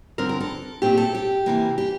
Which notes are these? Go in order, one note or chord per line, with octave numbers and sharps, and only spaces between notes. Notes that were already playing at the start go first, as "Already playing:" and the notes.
G2 D3 F3 C4 A#4
A#4
A4
A#2 A3 C4 G4
A4
G4
C3 E3 A#3
G4